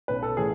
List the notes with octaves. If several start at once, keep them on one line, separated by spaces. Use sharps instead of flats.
B1 B2 B4
A4
A2 E3 G#4